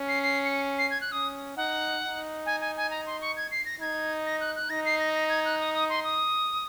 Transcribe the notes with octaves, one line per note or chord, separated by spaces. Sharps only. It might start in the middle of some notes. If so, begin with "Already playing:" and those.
Already playing: C#4
C7
C7
C#7
C7
G#6
F#6
C#4 D#6
D#4 F#5
D#4
G#5
G#5
G#5
A#5
C6
C#6
G#6
C7
A#6
D#4 G#6
A#6
F#6
F#6
D#4 A#6
C7
A#6
A#6
G#6
F#6
D#6
D#6
C6
D#6